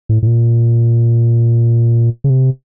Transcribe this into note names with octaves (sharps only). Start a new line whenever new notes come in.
A2
A2
A#2
C#3
C3